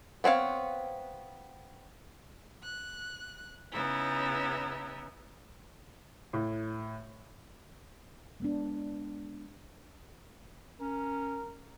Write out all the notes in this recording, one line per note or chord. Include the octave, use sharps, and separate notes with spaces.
B3 C4 C#5 F5
F#6
C#3 B3 D#4 E4
A2
G#3 B3 D4
C#4 A#4